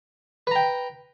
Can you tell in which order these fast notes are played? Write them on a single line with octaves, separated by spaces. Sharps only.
B4 A#5 G5